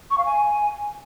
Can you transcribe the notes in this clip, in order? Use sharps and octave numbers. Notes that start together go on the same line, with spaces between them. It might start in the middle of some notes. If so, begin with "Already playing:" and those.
C#6
F5
G#5